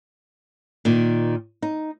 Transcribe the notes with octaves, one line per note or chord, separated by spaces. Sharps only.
A#2 D#3
D#4